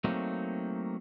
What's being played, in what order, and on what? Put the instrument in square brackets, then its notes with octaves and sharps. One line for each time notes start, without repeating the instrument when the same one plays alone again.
[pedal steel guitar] F#3 A3 A#3 C4 D#4